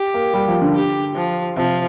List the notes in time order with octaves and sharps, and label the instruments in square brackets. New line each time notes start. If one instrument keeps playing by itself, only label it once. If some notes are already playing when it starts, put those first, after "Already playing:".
Already playing: [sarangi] G4
[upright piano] A#3
G3
F3
D3
[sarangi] G4
F3
[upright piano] C3 [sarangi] F3